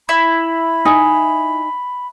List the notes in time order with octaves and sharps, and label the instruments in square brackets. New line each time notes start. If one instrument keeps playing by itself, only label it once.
[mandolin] E4 [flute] B5
[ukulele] D#4 G#5